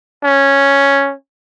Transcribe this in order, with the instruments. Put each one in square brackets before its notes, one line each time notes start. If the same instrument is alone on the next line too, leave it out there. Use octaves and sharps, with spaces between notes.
[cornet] C#4